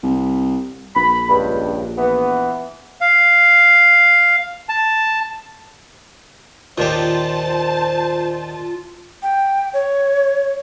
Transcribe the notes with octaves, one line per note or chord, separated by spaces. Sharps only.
C2
A#1 B5
C#2 G2
E3 B3
F5
A5
D#2 A#2 F4 G4 C5 A5
G5
C#5